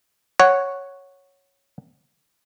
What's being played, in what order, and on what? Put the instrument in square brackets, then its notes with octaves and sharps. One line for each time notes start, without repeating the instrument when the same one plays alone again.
[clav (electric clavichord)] C#5 F#5